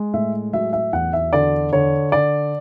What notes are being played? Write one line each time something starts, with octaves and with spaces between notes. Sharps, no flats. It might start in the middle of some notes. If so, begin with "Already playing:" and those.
Already playing: G#3
A2 E5
F#3 E5
E5
E2 F#5
E5
D3 D5
D3 C#5
D3 D5